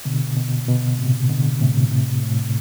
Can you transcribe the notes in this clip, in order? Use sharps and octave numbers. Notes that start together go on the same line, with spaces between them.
B2 D3
B2
B2
A2 C3
B2 D3
A2 C3
A2 C3
A2